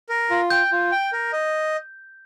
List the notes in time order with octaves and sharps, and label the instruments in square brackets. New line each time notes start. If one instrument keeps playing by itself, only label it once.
[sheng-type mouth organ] A#4
F4
[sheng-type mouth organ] G5 [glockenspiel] G6
[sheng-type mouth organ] F4
G5
A#4
D#5